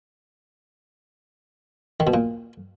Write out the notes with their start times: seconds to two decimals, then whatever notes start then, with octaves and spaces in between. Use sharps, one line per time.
2.00 D#3
2.07 B2
2.14 A#2